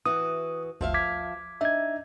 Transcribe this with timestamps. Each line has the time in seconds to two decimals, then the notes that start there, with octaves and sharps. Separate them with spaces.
0.06 E3 F#4 D#6
0.81 G1 D2 F3 E5 F5
0.94 D6 G#6 B6
1.61 D4 D#4 E5 G#6